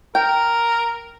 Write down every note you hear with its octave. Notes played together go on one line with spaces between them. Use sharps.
A#4 G5